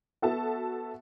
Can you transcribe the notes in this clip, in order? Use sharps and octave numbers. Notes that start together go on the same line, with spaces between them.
B3 F#4 A4 E5 A5